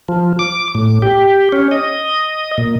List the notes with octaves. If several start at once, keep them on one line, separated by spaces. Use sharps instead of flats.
F3
D6
A2
G4
C#4
D#5
A#2